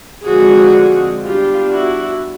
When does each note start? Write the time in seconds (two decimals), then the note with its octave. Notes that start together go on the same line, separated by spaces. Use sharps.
0.24 D3 F3 G#3 C4 F#4 G#4
1.22 G3 B3 D4 F4 G4
1.71 E4 F#4